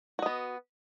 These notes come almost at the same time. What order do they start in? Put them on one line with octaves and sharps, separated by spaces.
F#4 D#5 B3